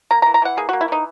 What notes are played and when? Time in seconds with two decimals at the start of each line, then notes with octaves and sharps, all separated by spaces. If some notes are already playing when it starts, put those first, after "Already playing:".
0.11 A#3 A#5
0.22 A#5
0.26 E3
0.34 A#5
0.42 E3 F#5
0.57 A#3 G#4
0.69 A#3 F#4
0.81 E4
0.88 E3 D#4